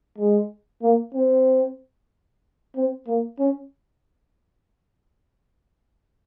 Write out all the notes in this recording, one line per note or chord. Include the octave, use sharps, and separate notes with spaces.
G#3
A#3
C4
C4
A#3
C#4